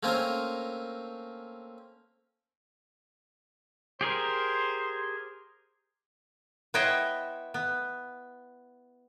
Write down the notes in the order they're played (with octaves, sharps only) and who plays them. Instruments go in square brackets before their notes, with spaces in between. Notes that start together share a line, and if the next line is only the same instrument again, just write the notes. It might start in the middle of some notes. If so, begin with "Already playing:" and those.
[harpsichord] A3 A#3 C4 C#4 A#4
[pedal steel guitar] G4 G#4 A#4 [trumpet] C5
[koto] B3 E4 C5 C#5 D#5 G5
B3